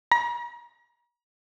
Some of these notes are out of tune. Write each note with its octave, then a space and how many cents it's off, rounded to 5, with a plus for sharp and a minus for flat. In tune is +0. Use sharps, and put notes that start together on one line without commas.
A#5 +45